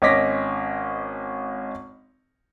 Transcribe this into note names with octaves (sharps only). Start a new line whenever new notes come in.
G#1 C#4 D#5 D6 A#6 B6